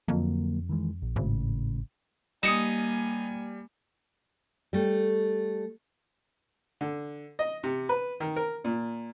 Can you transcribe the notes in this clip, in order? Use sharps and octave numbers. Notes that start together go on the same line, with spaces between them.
F2 D3 F#3 A#3
D#3 E3 G#3
A#1
G#1 A2 C#3
G3 A#3 D#4 G#5 D#6 C#7 E7
G3 A3
D3
D#5
C3
B4
D#3
A#4
A#2